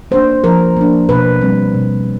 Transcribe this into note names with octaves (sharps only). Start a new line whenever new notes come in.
A#3 D4 C5
F3 A#4
A#3 D4
B2 B4
G3 C4
B2